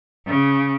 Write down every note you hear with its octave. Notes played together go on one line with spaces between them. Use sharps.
C#3